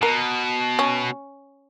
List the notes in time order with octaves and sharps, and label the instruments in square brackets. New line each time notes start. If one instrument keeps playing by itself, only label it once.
[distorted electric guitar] B2 [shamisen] A#4
[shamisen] C#4